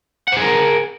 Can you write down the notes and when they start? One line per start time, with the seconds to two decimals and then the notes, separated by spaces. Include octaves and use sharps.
0.28 F#5
0.32 C5
0.37 G#4
0.41 A#4